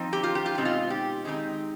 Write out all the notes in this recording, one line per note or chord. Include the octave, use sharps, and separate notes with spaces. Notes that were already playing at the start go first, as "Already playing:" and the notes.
Already playing: F3 C4 D#4
G4
F4
G4
F4
B2 G#3 C4 D#4 G4
F4
G4
D#3 G#3 C4 D#4